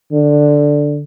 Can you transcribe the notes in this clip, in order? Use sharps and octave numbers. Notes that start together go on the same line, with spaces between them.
D3